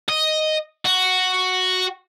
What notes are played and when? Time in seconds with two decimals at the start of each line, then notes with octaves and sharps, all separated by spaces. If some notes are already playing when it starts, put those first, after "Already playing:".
0.09 D#5
0.86 F#4